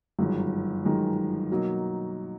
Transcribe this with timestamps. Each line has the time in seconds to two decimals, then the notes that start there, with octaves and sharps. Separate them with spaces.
0.19 G1 F#2 D#3 G#3
0.85 G1 F#2 D#3 G#3
1.51 B2 F#3 A#3 D#4